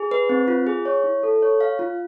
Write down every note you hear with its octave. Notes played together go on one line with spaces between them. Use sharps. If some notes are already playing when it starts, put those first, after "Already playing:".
Already playing: G#4
B4
C4
F4
G#4
C#5
E4
A4
C#5
F5
F4